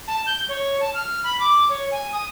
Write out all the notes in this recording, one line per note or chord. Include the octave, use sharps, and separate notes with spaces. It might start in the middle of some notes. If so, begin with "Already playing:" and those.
A5
G6
C#5
A5
F6
B5
D6
C#5
G#5
D#6